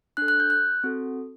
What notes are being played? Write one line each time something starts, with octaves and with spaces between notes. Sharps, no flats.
D4 A4 F#6
F#6
G6
F#6
C4 F#4 A4